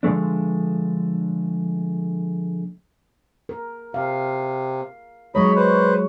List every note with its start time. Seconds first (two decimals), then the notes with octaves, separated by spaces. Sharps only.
0.03 D3 F3 G#3 A3 D4
3.49 A#4
3.94 C3 F5
5.35 F#3 G#3 D#4 C#5 D#5 B5
5.56 B4 C5